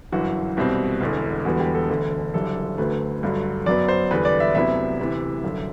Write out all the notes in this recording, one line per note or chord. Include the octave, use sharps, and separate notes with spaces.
G1 F#2 E3 F#4
C2 B2 G3 C4
E1 E2 D3
E1 E2 D3 G3 B3 F#4
G4
A4
E1 D2 D3 A4
F#1 F#2 D3 G3 D4 A4
D2 D3 F#3 A3 B4
G1 G2 D3 F#3
F#2 F#3 B3 D5
C5
E2 D3 G3 B4
D5
E5
D2 C3 F#3 B3 E4 E5
D2 C3 E3
G1 F#2 D3